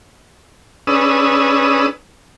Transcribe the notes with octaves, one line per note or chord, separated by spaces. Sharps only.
C#4 D4 G#4 B4 D#6 E6